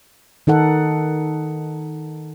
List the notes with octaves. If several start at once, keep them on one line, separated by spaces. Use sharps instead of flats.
D#3 D#4 A4 F#5